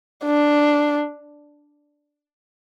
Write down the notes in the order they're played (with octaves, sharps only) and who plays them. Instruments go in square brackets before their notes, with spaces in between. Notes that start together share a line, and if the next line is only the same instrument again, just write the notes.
[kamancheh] D4